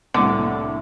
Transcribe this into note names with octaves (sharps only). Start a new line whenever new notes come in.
C2 A2 D3 F#5 C6 D6